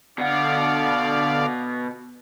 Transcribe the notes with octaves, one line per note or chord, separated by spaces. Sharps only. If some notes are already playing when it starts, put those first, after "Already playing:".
B2 D3 D5 F5 F#5